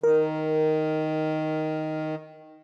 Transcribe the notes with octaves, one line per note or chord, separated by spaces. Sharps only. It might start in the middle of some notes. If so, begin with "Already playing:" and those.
D#3 A#4